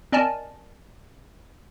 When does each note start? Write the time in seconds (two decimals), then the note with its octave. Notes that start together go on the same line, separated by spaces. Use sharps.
0.12 C4 A#4 D5 D#5 G#5 A5